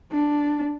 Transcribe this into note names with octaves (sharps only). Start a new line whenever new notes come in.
D4